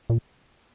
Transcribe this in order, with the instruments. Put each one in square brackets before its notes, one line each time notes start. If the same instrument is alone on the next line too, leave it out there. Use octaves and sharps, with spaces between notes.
[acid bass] A#2